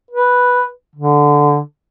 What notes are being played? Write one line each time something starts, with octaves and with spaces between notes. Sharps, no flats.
B4
D3